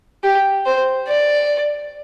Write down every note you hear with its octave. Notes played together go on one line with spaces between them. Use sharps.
G4
C5
D5